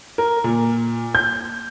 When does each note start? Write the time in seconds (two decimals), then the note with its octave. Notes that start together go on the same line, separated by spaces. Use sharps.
0.18 A#4
0.44 A#2
1.15 G6